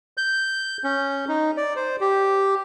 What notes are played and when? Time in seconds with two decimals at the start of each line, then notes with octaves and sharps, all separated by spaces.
0.17 G6
0.84 C#4
1.28 D#4
1.57 D5
1.76 C5
2.01 G4